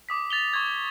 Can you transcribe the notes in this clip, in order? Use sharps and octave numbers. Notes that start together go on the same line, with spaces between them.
D6 D#6 B6
A6 F7 G7
C#6 G#6